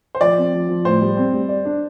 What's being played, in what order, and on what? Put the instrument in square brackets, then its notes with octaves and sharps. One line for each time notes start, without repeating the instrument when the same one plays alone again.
[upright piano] C5
[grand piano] F3 [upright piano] D5
[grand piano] C4
F3
F3
[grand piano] A2 [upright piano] C5
[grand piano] G3
C4
G3
D5
D4